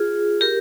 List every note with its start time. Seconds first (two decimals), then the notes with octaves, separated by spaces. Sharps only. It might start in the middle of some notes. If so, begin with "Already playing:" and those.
Already playing: F4 G#4
0.41 G4 A#4